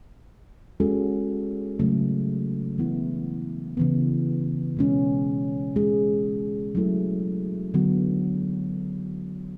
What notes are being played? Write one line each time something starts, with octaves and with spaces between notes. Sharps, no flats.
G#3 C#4 F#4 A4
C#3 F#3 A3
E3 B3 E4
C#3 E3 B3
B2 G#3 C#4
G#3 C#4 G#4
F#3 A3 E4 A4
D3 F#3 B3 F#4